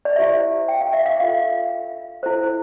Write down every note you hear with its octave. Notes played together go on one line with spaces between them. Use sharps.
D5
E4 G4 C5 E5
G5
F5
E5
F5
D4 F4 A4 F5
E4 A4 C5